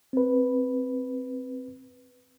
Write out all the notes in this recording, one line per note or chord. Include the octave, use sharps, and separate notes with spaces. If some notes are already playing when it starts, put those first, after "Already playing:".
C4 B4